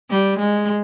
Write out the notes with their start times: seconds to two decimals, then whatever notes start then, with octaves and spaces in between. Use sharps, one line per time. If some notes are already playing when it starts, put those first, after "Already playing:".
0.10 G3
0.39 G#3